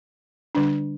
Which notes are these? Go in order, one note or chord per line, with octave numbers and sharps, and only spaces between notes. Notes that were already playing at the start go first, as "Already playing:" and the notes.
D3 G3 D4